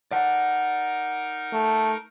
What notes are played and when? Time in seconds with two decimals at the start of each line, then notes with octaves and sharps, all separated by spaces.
0.11 D#4 A#4 D5 F#5
1.53 A3